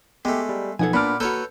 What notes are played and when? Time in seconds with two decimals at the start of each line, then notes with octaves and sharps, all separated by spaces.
0.25 G#3 A3 B3 G4
0.49 G3
0.79 B1 F3 B3 D#4 A4 F#5 G#5 G#6
0.93 A#2 A#3 B3 D4 F#5 B5 D6 F6
1.20 A#3 F#4 A4 B4 C#5 E6 G6